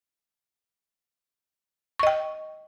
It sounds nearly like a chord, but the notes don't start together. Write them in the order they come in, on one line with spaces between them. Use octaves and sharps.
C#6 D#5 G5